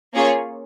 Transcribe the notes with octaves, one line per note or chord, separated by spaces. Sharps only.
A#3 C#4 F4 G#4 C#5